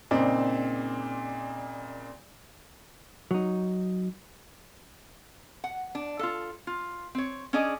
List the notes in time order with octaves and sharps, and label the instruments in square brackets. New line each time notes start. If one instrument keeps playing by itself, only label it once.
[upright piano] A#2 C#3 C4 D#4 D5
[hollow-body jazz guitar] F#3 D#4
[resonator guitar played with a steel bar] F#5
D4
F4 A4
F4
C4 C#5
C#4 D4 G#4 D5 D#5